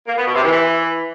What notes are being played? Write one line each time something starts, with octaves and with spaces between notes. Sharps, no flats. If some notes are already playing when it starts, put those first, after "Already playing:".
A#3
B3
B2
C3
E3